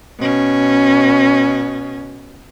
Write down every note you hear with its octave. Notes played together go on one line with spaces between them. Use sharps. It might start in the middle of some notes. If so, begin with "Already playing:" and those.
B2 C#4